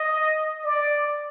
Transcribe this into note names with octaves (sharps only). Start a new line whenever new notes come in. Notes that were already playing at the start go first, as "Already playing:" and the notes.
Already playing: D#5
D5